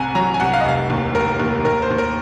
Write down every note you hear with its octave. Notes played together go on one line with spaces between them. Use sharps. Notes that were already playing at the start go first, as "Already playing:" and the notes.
Already playing: C2 C3 F#5 G#5 A#5
F#3 A#5
G#5
C2 F#5
F5
D#5
F1 F5
D#2
F1 A#4
D#2
D#2 A#4
C5
D#2
A#4